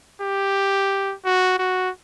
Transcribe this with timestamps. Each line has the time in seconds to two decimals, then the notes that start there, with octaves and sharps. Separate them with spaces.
0.22 G4
1.25 F#4
1.59 F#4